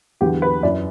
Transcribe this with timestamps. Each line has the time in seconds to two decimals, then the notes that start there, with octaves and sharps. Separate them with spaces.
0.21 E2 D3 F#3 G4
0.42 B4
0.63 F#2 E3 D5